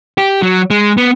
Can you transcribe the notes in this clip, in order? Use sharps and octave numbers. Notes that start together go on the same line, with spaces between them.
G4
F#3
G#3
B3